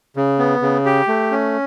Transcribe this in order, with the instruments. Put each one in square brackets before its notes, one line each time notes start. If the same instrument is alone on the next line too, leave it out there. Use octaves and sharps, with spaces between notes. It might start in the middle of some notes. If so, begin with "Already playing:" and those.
[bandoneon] C#3
B3
C#3
G4
A3
C#4